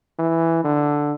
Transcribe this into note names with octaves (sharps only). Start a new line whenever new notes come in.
E3
D3